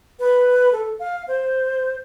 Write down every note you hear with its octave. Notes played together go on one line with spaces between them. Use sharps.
B4
A4
F5
C5